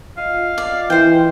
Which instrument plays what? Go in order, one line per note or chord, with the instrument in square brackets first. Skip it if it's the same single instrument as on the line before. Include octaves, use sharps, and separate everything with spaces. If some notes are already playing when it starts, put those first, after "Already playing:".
[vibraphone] F4 D#5 [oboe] F5
[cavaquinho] D5
[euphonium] E3 [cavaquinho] C5 G5